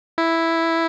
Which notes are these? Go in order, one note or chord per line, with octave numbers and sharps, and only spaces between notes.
E4